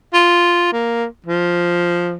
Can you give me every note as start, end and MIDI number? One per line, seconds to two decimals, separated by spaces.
0.13 0.69 65
0.72 1.05 58
1.27 2.16 53